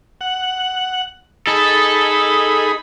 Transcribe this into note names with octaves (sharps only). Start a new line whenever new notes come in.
F#5
D#4 G#4 A4 B5